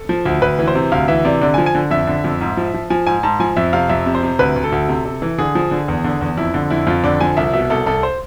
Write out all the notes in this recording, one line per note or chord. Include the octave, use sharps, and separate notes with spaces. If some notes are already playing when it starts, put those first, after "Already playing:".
Already playing: A4
F3
D2
D2 B4
E3
C5
C3
D2 F5
E3 E5
C3 D5
D3 D5
G#5
F3
G#5
D3
F2 E5
D3
F2
G#2
F3
F3
F3 G#5
G#2 G#5
G#2 A5
F3 G#5
F2 E5
C3 F5
F2 E5
C3
C5
C3
D2 B4
D2
A4
D2
C3
C3
E3
D3 G#4
F3
D3
E2
D3
E2
F2 E4
D3
F2 E4
F2 F4
D3 D5
F3 G#5
C2 E5
B2 E5
C2 A4
C2 A4
C5